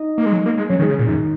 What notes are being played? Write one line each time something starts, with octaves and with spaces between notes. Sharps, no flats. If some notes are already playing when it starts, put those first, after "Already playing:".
Already playing: D#4 D#5
A#3
G#3
F#3
A#3
G#3
F#3 C#4 C#5
D#3
G#3 G#4
C#3
A#2
F#2 D#3 D#4